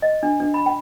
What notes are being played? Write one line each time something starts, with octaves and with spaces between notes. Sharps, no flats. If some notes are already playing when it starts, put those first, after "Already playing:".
D#5
D4
D4
B5
G5